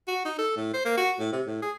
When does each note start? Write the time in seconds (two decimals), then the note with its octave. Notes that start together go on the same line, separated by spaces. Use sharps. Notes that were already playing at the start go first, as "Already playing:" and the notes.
0.08 F#4
0.25 D#4
0.38 A4
0.57 A2
0.74 C5
0.85 A#3
0.97 F#4
1.19 A2
1.32 C3
1.46 A2
1.62 G#4